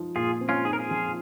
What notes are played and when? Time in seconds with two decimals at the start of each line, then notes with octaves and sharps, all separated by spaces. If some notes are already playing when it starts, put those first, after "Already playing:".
Already playing: F3 D#4
0.16 A#2 F4 G#4
0.41 C4
0.49 C#4 F4
0.65 D#4 G#4
0.73 A#4
0.79 F4 G#4
0.91 F3